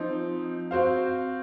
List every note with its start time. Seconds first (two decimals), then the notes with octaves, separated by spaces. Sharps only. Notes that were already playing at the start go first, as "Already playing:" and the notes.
Already playing: F3 C4 D#4
0.71 C4 F#4 C5 F5